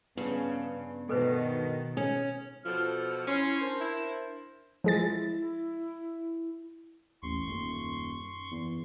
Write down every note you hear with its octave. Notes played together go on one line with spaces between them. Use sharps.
G2 C#3 B3
B2 D#3 A4 B4 C5
C#4 G#4 C#7
B2 F3 A4 F6
C#4 E4 C6
D4 A#4 C5
E4
F3 G#3 E4 A6
A1 D#2 C6 C#6
D#1 F#2
E2